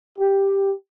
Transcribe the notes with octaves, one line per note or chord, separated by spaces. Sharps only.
G4